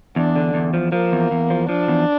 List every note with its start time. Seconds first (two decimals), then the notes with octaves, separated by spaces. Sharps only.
0.16 E2 D4
0.36 D3
0.54 E2
0.74 F3
0.92 F3 A#3
1.12 E2
1.31 E2
1.50 F3
1.69 F3 D4
1.88 E2